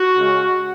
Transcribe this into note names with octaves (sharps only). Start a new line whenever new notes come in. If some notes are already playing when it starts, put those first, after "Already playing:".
Already playing: F#4
C#3 G#3 C#4